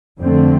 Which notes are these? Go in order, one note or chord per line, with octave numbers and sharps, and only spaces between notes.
F2 D3 A3 C4